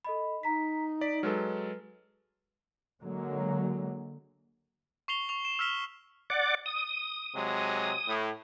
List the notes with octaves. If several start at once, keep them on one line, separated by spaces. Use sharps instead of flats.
A4 D#5 B5
D#4 A#5 B6
D5 B6 D7
F#3 G#3 A4 B4 F6
D3 F#3 G#3 A#3
C#6 C7 F7 G7
C#6 F7
E7
E6 F6 B6 G7
D5 F#5 D6
D#6
C3 F#3 G#3
A2